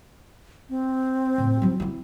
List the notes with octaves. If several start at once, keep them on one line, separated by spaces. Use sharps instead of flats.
C4
A2
F#3 E4
C4 E4